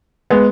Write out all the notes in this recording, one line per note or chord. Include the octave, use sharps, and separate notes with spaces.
G#3 B3